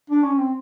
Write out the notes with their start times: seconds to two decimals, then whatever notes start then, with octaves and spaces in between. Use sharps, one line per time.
0.10 D4
0.24 C#4
0.38 C4